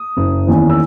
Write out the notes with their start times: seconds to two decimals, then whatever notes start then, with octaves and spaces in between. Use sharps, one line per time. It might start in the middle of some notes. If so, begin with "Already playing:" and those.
Already playing: D#6
0.17 F#1
0.47 E2 D#3 A#3 C#4
0.70 E6